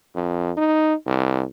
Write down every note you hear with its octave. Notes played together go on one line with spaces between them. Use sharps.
F2
D#4
C2